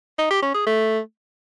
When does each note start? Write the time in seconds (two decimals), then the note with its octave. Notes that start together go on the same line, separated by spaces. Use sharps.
0.19 D#4
0.31 G4
0.43 C#4
0.55 G#4
0.67 A3